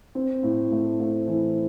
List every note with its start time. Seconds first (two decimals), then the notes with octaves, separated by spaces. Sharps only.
0.15 C4
0.43 A2
0.71 A3
1.00 A3
1.27 E3